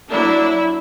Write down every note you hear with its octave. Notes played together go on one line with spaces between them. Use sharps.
F#3 A#3 D4 E4